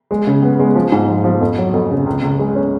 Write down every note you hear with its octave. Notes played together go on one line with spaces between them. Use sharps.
G#3
C#3
B3
G#3
F3
G#2
F3
F3
F2
F#3
F2
C#3
C#2
C#2
G#3
C#4